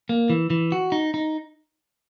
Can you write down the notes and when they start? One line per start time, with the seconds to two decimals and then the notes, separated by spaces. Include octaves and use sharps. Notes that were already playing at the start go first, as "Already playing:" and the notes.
0.09 A#3
0.30 E3
0.50 E3
0.72 F#4
0.92 D#4
1.14 D#4